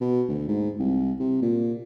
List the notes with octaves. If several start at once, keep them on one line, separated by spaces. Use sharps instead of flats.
B2
D2
G#2
C2
C3
A#2